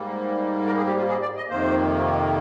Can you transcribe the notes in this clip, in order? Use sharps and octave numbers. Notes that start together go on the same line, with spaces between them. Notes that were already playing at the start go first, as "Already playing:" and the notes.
Already playing: G#2 G3 A#3
A#4
G#4
G4
F4
G#4
D5
D#5
F2 C3 D#3 A#3 C5